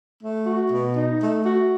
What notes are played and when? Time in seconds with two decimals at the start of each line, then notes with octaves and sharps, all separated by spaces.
0.22 A3
0.46 F#4
0.71 B2
0.96 D#4
1.20 A3
1.46 F#4